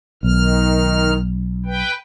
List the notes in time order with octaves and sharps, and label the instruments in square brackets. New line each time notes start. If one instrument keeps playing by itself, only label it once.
[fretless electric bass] B1 [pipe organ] D#3 F6
[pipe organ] B4 G5